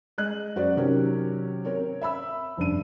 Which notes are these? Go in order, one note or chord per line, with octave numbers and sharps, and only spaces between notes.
G#3 D#5 F#6
F#2 F#4 C5 D5
C3 D#3 F#3 C#4 G4 A#4
C4 A#4 C#5
E5 B5 E6
F1 G2 D3 D#7